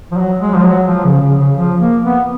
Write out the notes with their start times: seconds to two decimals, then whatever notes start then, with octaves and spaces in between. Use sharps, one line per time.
0.11 F3
0.17 F#3
0.40 G#3
0.55 F3
0.64 F#3
0.88 F3
1.05 C#3
1.22 C#3
1.39 C#3
1.57 F3
1.81 A#3
2.03 B3